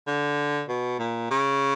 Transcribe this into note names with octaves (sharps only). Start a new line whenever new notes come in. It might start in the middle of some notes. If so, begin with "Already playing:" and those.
D3
B2
A#2
C#3